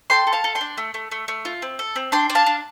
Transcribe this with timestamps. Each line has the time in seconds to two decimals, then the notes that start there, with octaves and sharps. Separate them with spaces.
0.10 A4 G5 C6
0.27 A4
0.32 F5 A5
0.44 A4
0.55 G5 C6
0.61 D4
0.77 A3
0.94 A3
1.11 A3
1.28 A3
1.45 F4
1.62 C4
1.79 A4
1.96 C4
2.12 D4 G5 C6
2.30 D4
2.35 F5 A5
2.46 D4